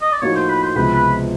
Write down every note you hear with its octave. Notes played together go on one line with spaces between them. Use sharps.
D#5
D5
A2 F3 A#3 D#4 F#4 C#5
C5
B4
C5
C#2 C3 F3 G#3 B3 B4
B4